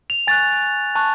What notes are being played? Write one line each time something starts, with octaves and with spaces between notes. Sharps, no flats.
F7
G#5 C#6 F#6 A6
A5 C#6 F#6